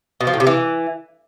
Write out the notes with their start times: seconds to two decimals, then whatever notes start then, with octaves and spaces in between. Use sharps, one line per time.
0.21 B2
0.27 F3
0.34 A2
0.40 C3
0.47 E3